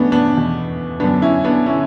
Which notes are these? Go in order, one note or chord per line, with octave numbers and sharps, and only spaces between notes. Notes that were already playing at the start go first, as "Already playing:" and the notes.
Already playing: E2 B2 A3 B3 C#4 D4
B3 D4
E2 B2
F#2 D3 B3 D4
C#4 E4
B3 D4
D3 C#4 E4